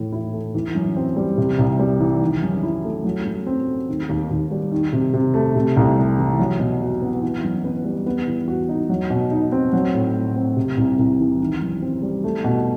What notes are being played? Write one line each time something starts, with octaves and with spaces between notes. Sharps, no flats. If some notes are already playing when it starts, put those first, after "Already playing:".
Already playing: A2 E3
E4
A3
E3
F#2
C4
G3
C3
C2
G3
E3
D#3
F#2
E4
A3
F#3
F#2
C4
A3
D#3
D#2
D#2
G3
D#3
C3
C3
A3
C3
C2
G3
E3
F#3
B2
F#4
B3
E3
F#2
B3
G3
B3
E3
F#4
D#4
F#3
B2
D#4
C4
F#3
A2
A2
C4
C3
C2
C2
E3
D#3
F#2
C4
G3
A3
B2